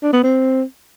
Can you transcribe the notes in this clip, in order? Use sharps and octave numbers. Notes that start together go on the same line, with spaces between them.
D4
B3
C4